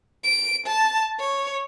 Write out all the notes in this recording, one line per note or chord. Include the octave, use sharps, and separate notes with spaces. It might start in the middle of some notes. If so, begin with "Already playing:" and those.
D7
A5
C#5